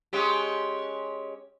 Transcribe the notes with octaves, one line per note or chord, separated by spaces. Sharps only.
G#3 C#4 G4